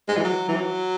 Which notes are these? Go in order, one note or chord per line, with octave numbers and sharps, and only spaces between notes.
G#3
E3
F#3
E3
F#3